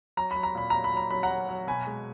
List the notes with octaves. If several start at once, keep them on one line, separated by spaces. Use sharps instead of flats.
F#3 A#5
F#3 B5
A#5
A#2 B5
F#3 A#5
B5
F#3 A#5
F#3 B5
F#5 A#5
F#3
F#3
B2 G#5 B5
G#3